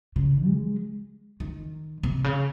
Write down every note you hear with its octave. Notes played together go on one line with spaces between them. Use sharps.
C#3
G#3
D#3
C3
C#3